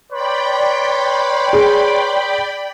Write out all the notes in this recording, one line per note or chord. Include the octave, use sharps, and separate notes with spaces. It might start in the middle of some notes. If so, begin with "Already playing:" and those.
B4 C#5 D5 G5 B5 C6
G#4